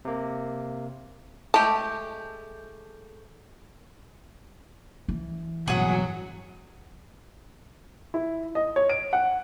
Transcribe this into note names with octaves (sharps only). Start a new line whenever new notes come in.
C3 A#3
G#3 A3 G4 A5
E3
A1 G2 B2 F#3 G#4 F#5
E4
D#5
C#5
D7
F#5